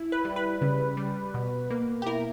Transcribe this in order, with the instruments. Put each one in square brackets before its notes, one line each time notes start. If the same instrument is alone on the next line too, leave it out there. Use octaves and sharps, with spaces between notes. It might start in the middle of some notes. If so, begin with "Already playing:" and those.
Already playing: [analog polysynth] E4
B4
G3
B4
C#3
G3
B2
A#3
G4
E4 A#4